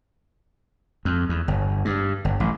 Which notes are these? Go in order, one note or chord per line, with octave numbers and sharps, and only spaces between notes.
F2
E2
G1
G2
G1
A1